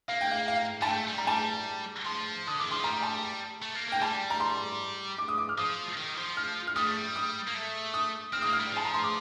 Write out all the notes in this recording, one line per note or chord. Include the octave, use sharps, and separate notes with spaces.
A#3 F5
G5
F5
F5
G3 A5
A3 G5
G3
A#5
G3 A5
F3 C6
D3 D#6
D#3 D6
F3 C6
G3 A#5
A5
A3
A#3
A#3 G5
G3 A5
A#5
C6
D6
D#6
D6
F6
F3 D#6
D#3
F3
F6
F6
G3 D#6
A3
G3
D#6
A#3
A3
D#6
C4 F6
A#3 D#6
F6
G3
F3 A5
A#5
C6
D6